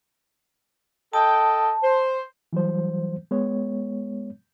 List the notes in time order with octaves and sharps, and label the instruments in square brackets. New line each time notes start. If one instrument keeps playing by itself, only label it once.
[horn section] A4 D#5 G5 [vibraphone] A5
[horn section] C5
[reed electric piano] E3 F#3 G3 C5
G#3 B3 C#5